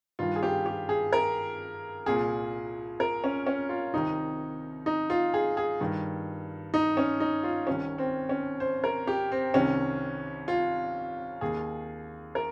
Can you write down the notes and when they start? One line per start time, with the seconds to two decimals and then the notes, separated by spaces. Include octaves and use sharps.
0.19 G2 D#3 F4
0.36 G#4
0.43 G4
0.66 G4
0.89 G#4
1.13 A#4
2.06 C2 A#2 G#4
3.00 A#4
3.24 C#4
3.47 C#4
3.69 F4
3.93 C2 C3 D#3 D#4
4.86 D#4
5.10 F4
5.34 G#4
5.57 G#4
5.80 G2 D#3
6.74 D#4
6.97 C#4
7.20 D#4
7.43 F4
7.67 C2 C3 D#3 C#4
7.98 C4
8.29 C#4
8.60 C5
8.84 A#4
9.07 G4
9.32 C4
9.54 C2 C3 D#3 C#4
10.48 F4
11.41 D#2 D#3 G#4
12.35 A#4